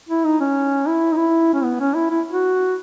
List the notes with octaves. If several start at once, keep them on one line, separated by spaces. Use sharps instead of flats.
E4
D#4
C#4
E4
D#4
E4
C#4
B3
C#4
E4
E4
F#4